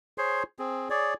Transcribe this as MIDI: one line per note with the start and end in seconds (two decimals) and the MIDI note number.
0.18 0.43 68
0.18 0.43 72
0.18 0.43 73
0.18 0.43 84
0.59 0.89 60
0.59 0.89 68
0.90 1.14 68
0.90 1.14 73
0.90 1.14 74